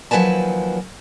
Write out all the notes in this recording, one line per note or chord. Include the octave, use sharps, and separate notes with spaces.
D#2 F3 F#3 B4 G#5 A5